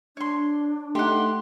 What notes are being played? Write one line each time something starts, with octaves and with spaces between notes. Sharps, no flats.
D4 C#5 C6
A3 D#4 G4 F#5 C6